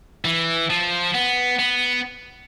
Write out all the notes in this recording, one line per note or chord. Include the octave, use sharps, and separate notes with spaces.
E3
F3
B3
B3